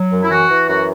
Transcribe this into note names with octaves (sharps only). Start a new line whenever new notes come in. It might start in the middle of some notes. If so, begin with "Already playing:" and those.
Already playing: F#3
F#2
E4
E3 F#4
E3
F#2 F#4